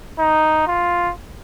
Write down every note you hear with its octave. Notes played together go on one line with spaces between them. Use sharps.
D#4
F4